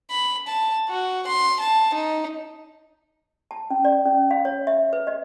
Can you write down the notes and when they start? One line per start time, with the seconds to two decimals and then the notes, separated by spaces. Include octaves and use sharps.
0.11 B5
0.48 A5
0.89 F#4
1.27 C6
1.60 A5
1.94 D#4
3.51 A5
3.70 C#4
3.85 D5
4.05 C#4
4.31 F5
4.45 C#5
4.67 E5
4.93 B4
5.07 D#5